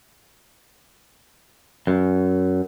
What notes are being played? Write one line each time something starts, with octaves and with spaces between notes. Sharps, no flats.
F#2